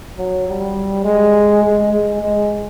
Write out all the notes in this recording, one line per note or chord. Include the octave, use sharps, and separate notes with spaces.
F#3
G3
G#3
G#3
G#3
G#3